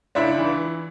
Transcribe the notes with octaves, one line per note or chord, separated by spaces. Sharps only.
C#2 D4 E4
E3